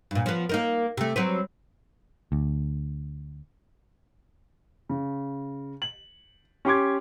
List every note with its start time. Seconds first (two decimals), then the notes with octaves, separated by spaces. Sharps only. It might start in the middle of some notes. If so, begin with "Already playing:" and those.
0.11 G2 A#2
0.26 F3 B3
0.49 A#3 D#4 A#4
0.97 C3 A3
1.16 F#3 C4 B4
2.32 D2
4.89 C#3
5.82 F#7
6.65 C#4 G4 C6 D6 G#6